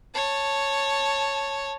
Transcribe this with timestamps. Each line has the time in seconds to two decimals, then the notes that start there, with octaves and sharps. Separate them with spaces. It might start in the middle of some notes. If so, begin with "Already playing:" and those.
0.14 C#5 A5